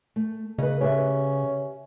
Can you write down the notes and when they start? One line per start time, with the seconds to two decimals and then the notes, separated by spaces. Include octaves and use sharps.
0.16 A3
0.58 C#3 B4 D#5
0.81 C#4 G4 B4 E5